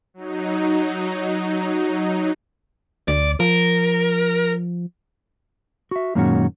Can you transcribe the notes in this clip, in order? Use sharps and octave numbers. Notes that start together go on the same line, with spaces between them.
F#3 D#4
D2 D5
F3 A#4
F#4 E5
F#2 A#2 D#3 G#3 C#4 F#4